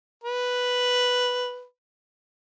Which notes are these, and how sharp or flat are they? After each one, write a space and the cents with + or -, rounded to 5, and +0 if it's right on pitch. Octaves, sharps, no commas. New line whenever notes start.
B4 +0